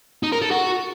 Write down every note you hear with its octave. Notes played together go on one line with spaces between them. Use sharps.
D#4
A#4
A4
F#4